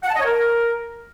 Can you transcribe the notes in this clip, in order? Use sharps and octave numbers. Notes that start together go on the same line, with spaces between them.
F#5
A5
D#5
C#5
A#4